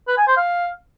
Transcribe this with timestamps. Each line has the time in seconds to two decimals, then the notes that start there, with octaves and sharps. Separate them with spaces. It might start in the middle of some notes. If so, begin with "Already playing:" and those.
0.08 B4
0.17 G#5
0.27 C5
0.37 F5